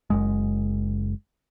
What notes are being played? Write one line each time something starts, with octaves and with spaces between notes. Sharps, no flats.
F#1 F#2 G#3